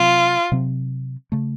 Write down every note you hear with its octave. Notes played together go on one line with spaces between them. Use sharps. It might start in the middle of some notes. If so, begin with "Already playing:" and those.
Already playing: C3 F#3 C4 F4
C3 F#3 C4
C#3 A3